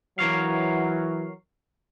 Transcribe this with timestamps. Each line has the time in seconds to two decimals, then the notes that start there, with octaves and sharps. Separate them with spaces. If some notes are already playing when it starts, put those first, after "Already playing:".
0.19 E3 F#3 A#4 C#5 F5